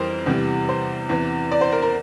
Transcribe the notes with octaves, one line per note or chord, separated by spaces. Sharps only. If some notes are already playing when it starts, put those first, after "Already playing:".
Already playing: F2 E3 G3 A#4 C5
E2 C3 E3 G3
C5
E2 C3 E3
D5
C5
A#4
A#4